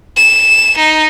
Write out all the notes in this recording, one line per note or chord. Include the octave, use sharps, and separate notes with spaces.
E7
D#4